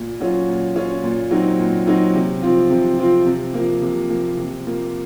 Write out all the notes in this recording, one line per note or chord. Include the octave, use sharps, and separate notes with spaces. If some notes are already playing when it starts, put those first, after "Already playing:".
Already playing: A#2
F#3 C#4 F4
A#2
F#3 C#4 F4
A#2
F#3 C4 D#4
A#2
F#3 C4 D#4
C3
F3 C4 F4
C3
F3 C4 F4
C3
F3 A#3
C3
F3 A#3
C3
F3 A#3